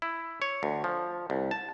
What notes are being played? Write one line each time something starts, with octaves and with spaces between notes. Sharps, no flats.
E4
C#5
D2
F3
C2
A5